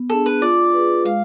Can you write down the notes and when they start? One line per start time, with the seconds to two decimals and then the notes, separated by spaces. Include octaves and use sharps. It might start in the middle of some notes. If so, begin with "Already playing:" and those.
Already playing: B3
0.10 D4 G#4 A4
0.26 B4
0.41 F4 D5
0.74 G#4 B4
1.05 G#3 F5